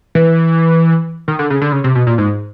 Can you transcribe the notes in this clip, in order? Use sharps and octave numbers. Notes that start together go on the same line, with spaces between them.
E3
D#3
D3
C#3
D3
C#3
C3
B2
A#2
G#2